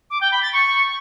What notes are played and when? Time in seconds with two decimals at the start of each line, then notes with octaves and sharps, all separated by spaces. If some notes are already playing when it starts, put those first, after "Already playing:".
0.10 D6
0.21 G5
0.32 B5
0.42 A6
0.53 C#6